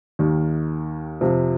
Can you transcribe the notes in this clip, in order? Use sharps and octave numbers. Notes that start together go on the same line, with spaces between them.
D#2 D#3
F2 C3 F3